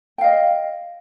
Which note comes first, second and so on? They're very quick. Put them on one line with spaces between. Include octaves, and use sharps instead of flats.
G5 F5 D#5